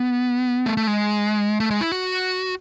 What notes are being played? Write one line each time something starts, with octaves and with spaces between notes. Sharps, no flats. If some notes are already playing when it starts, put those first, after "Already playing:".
Already playing: B3
A3
A3
G#3
A3
G#3
E4
F#4